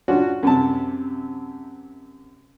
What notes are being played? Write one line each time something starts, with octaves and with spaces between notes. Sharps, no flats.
C#4 D4 F4 F#4
F#2 C3 A5